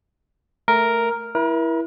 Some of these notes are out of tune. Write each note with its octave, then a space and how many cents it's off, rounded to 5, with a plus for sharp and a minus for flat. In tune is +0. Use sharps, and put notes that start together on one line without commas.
A3 +5 A#4 +0
E4 +0 A#4 +40